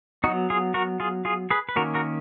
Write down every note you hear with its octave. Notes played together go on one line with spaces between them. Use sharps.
F#3 B3 D#4 F#4
F4 G#4
F#4 A#4
F4 G#4
F4 G#4
G#4 B4
B4
D#3 A#3 C#4 F#4 A#4
F#4 A#4